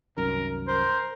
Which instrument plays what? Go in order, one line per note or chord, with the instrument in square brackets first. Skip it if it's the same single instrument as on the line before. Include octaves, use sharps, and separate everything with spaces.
[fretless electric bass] C2 F#2 D#3 [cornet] A#4
[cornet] A#4 [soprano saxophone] C5